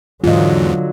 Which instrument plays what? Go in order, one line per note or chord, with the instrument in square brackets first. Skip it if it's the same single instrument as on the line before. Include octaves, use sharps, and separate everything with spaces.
[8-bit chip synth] E2 G#2 [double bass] D3 F#3 [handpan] F4 D#5